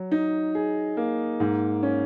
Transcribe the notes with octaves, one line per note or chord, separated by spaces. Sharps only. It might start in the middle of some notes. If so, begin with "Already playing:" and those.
Already playing: F#3
D#4
G#4
A#3
G#2
C#4